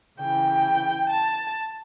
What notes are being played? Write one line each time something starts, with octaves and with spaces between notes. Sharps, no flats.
C#3 E3 G5
A5